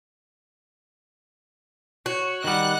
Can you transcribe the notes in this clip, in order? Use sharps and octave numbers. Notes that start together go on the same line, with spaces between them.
F#4 C#5
D#3 G3 D#5 F#5 F#6